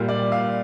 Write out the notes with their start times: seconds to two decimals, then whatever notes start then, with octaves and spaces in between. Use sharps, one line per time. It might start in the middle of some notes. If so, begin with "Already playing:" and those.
Already playing: A#2 G3 F4
0.08 D5
0.32 F5